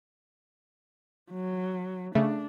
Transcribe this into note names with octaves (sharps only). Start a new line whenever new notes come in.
F#3
C#3 A3 D4